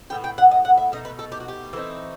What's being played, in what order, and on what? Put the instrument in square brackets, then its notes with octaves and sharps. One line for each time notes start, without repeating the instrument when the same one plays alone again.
[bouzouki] A2 G3 B3 G5
G5
F#5
D#5
F#5
E5
B2 A3 D#4 D#5
B4
A4
G4
F#4
G4
E3 A3 C4 D#4